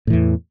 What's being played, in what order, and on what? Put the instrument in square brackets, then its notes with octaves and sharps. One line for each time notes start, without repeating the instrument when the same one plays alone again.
[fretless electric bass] A2
E3
E2